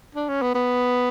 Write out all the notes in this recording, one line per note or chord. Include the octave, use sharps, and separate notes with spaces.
D4
C#4
B3
B3